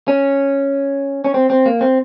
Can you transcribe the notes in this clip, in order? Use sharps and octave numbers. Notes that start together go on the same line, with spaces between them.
C#4
C#4
C4
C4
A#3
C4